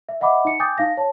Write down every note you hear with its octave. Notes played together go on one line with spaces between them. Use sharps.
E5
D#5 E5 F#5 B5 D6
D#4 C#7
G5 G#5 D6 D#6 G6 A6
D#4 F5 A#6
C#5 A5